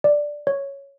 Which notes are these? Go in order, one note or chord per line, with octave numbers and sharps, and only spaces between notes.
D5
C#5